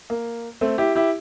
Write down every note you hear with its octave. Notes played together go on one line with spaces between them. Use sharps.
A#3
A3 C4
E4 G4
E4 G4